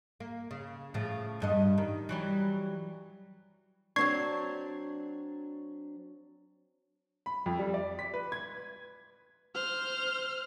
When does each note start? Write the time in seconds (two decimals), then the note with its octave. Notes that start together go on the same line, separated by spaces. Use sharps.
0.20 A#3
0.51 C#3
0.94 A2 C#3 F3
1.40 E2 G2 D#5
1.78 D#3
2.09 E3 F#3 G3
3.96 F#3 C4 D4 C#6 G#6 C7
7.26 B5
7.46 F2
7.59 G3
7.74 D5
7.99 B6
8.14 B4
8.32 G#6
9.55 C5 F6